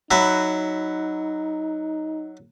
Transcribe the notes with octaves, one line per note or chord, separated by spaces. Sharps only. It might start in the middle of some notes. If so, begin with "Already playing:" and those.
F#3 D#4 F#4 B4 E5